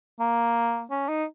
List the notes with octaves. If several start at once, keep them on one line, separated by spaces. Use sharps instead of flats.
A#3
C#4
D#4